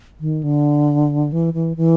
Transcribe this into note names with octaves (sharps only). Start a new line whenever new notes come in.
D#3
D3
E3
E3
E3